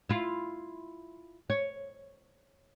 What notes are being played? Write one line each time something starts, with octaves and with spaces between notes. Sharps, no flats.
E4 F4
C#5